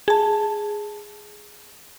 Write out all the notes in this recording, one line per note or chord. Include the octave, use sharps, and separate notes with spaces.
G#4 A5